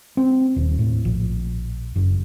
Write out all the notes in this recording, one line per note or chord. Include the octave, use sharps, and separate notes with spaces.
C4
D#1
A2
A#1
F#1